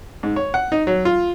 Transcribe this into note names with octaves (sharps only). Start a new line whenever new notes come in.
G#2
C#5
F#5
D#4
F#3
F4